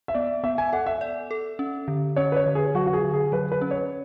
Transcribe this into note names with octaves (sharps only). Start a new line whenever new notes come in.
E5
B3 D5
B3 E5
G#5
A4 F#5
E5
D5
A4
C#4
D3
C#4 C#5
B4
C#5
D3
G#4
F#3 F#4
F#4
G#4
D3
G#4
F#3 B4
B4
C#4
C#5